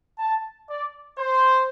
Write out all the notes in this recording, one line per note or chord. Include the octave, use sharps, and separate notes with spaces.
A5
D5
C5